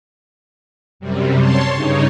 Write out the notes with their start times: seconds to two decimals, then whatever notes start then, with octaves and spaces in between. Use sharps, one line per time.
1.00 F#2 C3 G3
1.39 C#5 A5 C6
1.71 G2 C#3 C#4 D#4